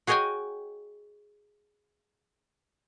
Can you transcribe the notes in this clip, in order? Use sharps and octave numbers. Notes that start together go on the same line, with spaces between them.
F#4 G#4 C#5 D#5 G5 G#5